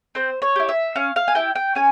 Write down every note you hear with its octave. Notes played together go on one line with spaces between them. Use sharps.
C4 C5
C#5
E4 G4
E5
C#4 F5
F5
G#5
E4 G4 G5
G5
C#4 G#5